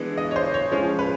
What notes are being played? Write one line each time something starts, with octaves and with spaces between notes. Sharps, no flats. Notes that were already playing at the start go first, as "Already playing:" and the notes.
Already playing: E3 G#3 B3 D4
D#5
C#5
C5
C#5
F3 G#3 C#4 C#5
B4